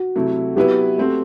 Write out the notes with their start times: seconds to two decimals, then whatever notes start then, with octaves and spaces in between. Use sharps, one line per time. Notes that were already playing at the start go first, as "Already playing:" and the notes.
Already playing: F#4
0.16 C3 F#3 A3 E4 A4
0.56 F#3 B3 E4 G4 B4 E5
0.98 A3 C4 F#4 C5